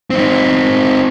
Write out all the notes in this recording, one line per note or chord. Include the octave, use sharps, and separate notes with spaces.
C4 D#4